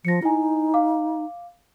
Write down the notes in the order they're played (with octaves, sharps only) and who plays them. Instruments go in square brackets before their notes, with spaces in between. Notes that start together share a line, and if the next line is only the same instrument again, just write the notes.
[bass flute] F3 [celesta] A#6 C#7
[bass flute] D#4 [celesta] E4 G#5
[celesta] F5 D6